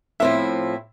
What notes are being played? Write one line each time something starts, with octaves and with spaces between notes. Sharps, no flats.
A2 F3 C4 E4 E5